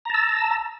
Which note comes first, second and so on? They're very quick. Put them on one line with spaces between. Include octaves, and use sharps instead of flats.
A#5 A5 E6